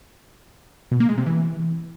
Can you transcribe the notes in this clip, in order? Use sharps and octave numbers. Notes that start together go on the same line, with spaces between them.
B2
A#3
G#3
C3
E3